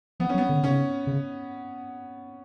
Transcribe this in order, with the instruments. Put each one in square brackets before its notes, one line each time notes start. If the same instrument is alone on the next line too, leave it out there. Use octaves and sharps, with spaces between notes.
[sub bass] F3 [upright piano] B3
[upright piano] C#4
[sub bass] F#3
[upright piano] B3
[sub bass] D3
[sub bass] C#3 [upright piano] C#4
[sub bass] C#3